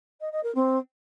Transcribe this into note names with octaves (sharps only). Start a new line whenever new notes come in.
D#5
D#5
A#4
C4